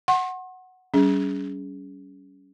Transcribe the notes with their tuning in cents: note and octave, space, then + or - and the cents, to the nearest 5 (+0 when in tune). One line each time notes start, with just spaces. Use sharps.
F#5 +0 C6 +45
G3 -30 C#4 +20 G#4 +0